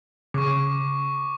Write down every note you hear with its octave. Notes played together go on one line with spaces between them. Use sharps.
C#3 C#6 D6